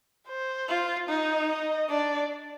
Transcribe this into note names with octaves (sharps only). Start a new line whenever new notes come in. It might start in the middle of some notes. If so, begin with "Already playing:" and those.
C5
F4
D#4 D#5
D#5
D4 D5